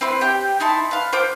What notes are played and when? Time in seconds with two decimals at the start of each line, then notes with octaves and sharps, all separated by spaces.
0.01 C4 E4 B4 C6
0.21 G4 G5
0.60 D#4 E4 A5 C6
0.91 B4 F5
1.13 F4 C5 D6